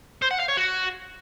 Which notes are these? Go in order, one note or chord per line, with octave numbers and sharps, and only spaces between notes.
C5
F#5
F5
C#5
F#4